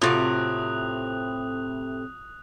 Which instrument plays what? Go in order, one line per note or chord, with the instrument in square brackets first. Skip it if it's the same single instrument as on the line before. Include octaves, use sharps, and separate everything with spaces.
[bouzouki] A2 C3 C4 [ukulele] F4 F#4 [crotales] D#6 F#6 F7